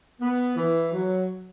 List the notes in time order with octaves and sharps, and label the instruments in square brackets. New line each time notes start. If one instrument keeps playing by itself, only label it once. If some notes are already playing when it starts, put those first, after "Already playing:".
[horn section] B3
E3
F#3